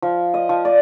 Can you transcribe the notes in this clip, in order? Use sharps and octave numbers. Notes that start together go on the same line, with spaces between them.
F3
D#5
F3
D5